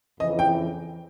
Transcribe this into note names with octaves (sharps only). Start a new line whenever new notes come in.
F2 C#3 E3 D#5
G5